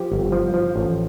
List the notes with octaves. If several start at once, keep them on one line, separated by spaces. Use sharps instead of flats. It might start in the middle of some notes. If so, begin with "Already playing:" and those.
Already playing: F3 G4
G1
F3
F3
A1